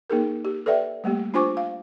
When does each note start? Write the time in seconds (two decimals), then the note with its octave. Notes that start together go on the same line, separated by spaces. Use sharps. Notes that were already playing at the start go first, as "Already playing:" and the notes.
0.10 A#3 D#4 G#4 A#4
0.45 G4
0.66 A4 B4 D5 E5 G5
1.04 G3 A3 A#3 G4
1.34 D4 F4 C5 G#5 C#6 D6
1.57 F5